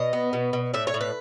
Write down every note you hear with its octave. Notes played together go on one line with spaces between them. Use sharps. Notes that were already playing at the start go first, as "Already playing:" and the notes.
Already playing: B2 D#5
B3
B2
B2
A2 E5
C#5
A2
B4